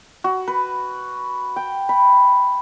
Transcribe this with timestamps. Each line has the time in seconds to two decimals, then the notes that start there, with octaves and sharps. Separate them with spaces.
0.24 F#4
0.48 B4
1.56 G5
1.89 B5